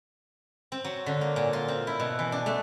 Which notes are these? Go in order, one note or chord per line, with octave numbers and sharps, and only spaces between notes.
C4
F#3
D3
A#3
A#2
F4
C4
E4
B2
E3
D4
A3